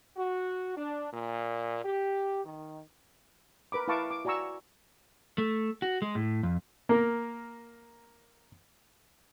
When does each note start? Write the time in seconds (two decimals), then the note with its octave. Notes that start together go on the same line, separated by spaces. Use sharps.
0.17 F#4
0.77 D4
1.13 A#2
1.83 G4
2.44 D#3
3.72 A#4 B4 B5 D6
3.88 E4 B4 F5 A5 C#6 D6
4.11 D6
4.25 F#4 D5 G#5 A#5 C#6 E6
5.38 A3
5.82 F#4
6.02 G#3
6.15 A2
6.43 F2
6.89 A#3 A#4